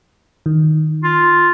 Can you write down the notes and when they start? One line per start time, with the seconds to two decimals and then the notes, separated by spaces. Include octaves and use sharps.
0.46 D#3
1.03 F4